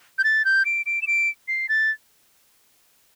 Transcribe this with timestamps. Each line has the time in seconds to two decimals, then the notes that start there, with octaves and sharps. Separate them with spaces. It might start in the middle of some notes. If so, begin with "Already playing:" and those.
0.19 G6
0.24 A6
0.45 G6
0.65 D7
0.86 D7
1.02 E7
1.07 D7
1.48 C7
1.69 A6